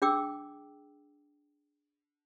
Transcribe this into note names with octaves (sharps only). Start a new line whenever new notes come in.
D4 G#4 G5 D6 E6